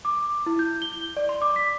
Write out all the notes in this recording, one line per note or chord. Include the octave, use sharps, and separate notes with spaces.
D6
E4
G6
G7
D5
C6
D6
B6